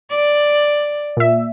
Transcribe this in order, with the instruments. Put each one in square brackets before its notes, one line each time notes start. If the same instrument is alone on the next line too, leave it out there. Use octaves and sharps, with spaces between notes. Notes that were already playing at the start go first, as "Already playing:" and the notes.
[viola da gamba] D5
[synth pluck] A#2 E5